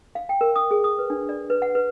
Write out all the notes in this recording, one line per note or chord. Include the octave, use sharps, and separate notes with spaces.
F5
G5
A#4
D#6
G#4
D#6
B4
D4
D5
B4
F#5
B4